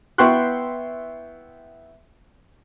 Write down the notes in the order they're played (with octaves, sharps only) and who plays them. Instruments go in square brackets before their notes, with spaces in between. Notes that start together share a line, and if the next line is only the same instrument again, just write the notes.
[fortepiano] B3 E4 G5 C6 C#6 F#6